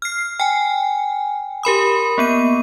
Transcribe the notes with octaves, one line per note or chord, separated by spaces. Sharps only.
F6 C7
G5 G#5
G4 A#4 B5 D#6
A#3 B3 D#7